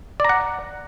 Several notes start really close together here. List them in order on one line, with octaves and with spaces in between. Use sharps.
D5 A#5 F#5